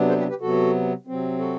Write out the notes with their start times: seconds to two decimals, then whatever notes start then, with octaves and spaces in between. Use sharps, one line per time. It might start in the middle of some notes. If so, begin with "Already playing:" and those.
Already playing: C3 F#3 B3 D4
0.08 A4 C5
0.19 G4 B4
0.29 G4 B4
0.41 C3 F#3 B3 F#4 A4
1.07 C3 F#3 C4
1.39 F#4 A4